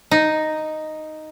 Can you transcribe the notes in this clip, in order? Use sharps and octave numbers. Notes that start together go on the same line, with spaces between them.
D#4